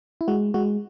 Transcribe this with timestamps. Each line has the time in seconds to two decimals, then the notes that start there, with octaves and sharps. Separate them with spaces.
0.21 E4
0.28 G#3 F#4
0.54 G#3 F#4